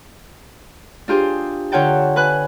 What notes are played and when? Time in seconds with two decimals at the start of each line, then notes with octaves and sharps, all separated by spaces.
1.08 D4 F4 G4 G#4 C5
1.72 D3 F4 C#5 F#5 G5 A5
2.16 B4 G#5 F#6